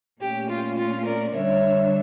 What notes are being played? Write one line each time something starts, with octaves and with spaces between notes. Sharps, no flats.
A#2 A3 C#4 G4
F4
F4
A#4 D5
D3 G3 D4 C#5 E5